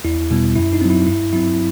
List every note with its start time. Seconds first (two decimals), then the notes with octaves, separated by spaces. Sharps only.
0.05 E2 E4
0.31 B2 G3 B3
0.56 F#2 E4
0.73 D#4
0.81 F#3 C4
0.90 E4
1.07 G2 E4
1.32 F#3 C4 E4